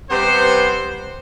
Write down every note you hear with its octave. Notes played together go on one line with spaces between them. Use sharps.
C3 G3 B3 C5